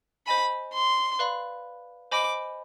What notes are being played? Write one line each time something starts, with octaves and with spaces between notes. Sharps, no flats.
C5 D#5 G#5 B5
C6
B4 D5 F5 B5
C5 D#5 G#5 B5 D6